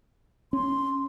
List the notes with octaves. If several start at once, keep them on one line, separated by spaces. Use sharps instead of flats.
C#4 C6